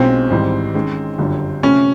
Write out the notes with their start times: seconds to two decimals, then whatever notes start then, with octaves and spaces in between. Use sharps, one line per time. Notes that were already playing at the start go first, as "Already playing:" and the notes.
Already playing: B1 B2 G#3 C4 C#4 F4
0.30 G#1 G#2 E3 G3
0.74 D#3 G#3 C#4
1.18 G1 F#2 D3 G3
1.63 C3 F3 A3 C#4